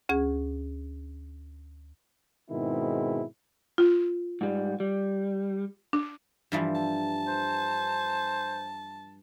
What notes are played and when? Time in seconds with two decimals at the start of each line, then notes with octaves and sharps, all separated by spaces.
0.09 D2 C#4 G#4 G#6
2.50 G#2 B2 D#3 G#3 C4 E4
3.78 F4
4.41 G#2 G3
4.80 G3
5.93 D4
6.52 G2 E3 F3
6.75 A5
7.27 C5